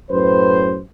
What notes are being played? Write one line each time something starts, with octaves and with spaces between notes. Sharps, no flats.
F#2 A2 B4 C5